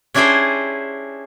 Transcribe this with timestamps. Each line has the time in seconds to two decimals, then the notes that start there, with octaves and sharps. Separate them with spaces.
0.14 C#4 D4 E4 G4 G#4 C5